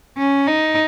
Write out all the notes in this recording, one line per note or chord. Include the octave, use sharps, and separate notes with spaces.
C#4
D#4